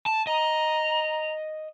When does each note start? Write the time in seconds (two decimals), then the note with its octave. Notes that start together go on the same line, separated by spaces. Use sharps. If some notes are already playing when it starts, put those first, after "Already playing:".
0.06 A5
0.27 D#5 A#5